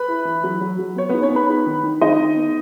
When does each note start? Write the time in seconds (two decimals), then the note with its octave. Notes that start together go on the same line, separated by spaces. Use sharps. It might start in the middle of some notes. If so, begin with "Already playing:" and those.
Already playing: B4 B5
0.08 E4
0.25 E3
0.44 F#3
0.61 F#3
0.79 F#3
0.96 B3 C#5
1.09 B3 D#4 B4
1.22 C#4 C#5
1.31 B3 B4 B5
1.49 D#4
1.67 D#3
1.83 D#3
2.01 D#3 D#4 D#5
2.20 D#3
2.36 B3